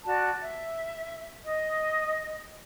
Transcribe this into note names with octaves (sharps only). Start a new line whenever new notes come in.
F#4 D5 A5
E5
D#5